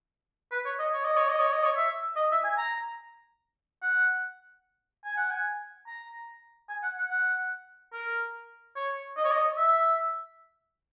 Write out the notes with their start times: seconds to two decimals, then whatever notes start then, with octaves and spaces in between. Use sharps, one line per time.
0.52 B4
0.65 C#5
0.79 D#5
0.94 C#5
1.05 D#5
1.17 C#5
1.29 D#5
1.40 C#5
1.52 D#5
1.64 C#5
1.76 E5
2.16 D#5
2.31 E5
2.44 G#5
2.58 A#5
3.82 F#5
5.05 G#5
5.17 F#5
5.31 G#5
5.87 A#5
6.69 G#5
6.83 F#5
6.98 F#5
7.11 F#5
7.93 A#4
8.76 C#5
9.17 D#5
9.25 C#5
9.32 D#5
9.57 E5